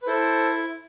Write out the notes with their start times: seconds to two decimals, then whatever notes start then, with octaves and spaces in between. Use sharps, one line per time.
0.02 B4
0.06 E4 A4 C5